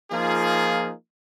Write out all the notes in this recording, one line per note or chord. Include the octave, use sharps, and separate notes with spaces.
F3 A#3 D#4 F4 G#4